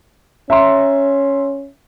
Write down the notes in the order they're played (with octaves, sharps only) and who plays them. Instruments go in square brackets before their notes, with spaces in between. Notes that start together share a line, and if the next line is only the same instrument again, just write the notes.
[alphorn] C#4 [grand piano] E5 A#5 C6